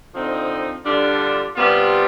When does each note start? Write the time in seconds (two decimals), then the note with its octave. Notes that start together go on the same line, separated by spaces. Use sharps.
0.14 D3 F3 C4 D#4
0.85 D3 G3 D4 F4
1.56 C3 G3 B3 F4